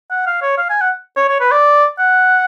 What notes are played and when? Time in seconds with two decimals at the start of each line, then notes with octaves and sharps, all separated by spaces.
0.11 F#5
0.26 F5
0.42 C#5
0.58 F5
0.70 G#5
0.81 F#5
1.16 C#5
1.28 C#5
1.40 B4
1.52 D5
1.99 F#5